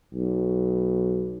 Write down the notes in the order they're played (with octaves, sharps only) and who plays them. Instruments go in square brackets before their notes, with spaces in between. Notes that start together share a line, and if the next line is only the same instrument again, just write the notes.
[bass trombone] B1